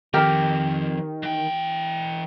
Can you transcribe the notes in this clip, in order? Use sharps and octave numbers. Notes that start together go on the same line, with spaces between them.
D#3 F3 C4 G4 A#4
E3 G5